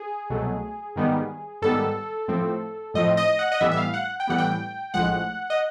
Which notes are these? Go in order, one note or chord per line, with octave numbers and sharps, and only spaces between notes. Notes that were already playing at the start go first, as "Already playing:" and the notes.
Already playing: G#4
C2 B2 F#3 A3
G#2 D#3 G3 B3
G#2 D#3 G3 B3 A4
A2 F3 A3 C4
A2 F3 A3 C4 D#5
D#5
F#5
D#5
A2 E3 G3 B3 E5
E5
F5
F#5
G5
A2 E3 G3 B3 F#5
G5
A#1 A2 F3 G#3 F#5
D#5